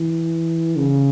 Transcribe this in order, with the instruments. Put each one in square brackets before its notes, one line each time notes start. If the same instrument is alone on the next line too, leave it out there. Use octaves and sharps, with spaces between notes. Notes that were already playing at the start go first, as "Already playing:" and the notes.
Already playing: [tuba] E3
C#3